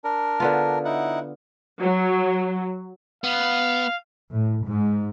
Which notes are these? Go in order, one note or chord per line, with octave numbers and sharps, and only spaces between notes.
D4 A#4
D3 B3 F4
D#4 E4 F#5
F#3
B3 F5
A2
G#2